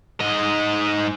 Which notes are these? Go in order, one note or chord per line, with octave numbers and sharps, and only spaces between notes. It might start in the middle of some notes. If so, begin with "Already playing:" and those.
G#2 D#5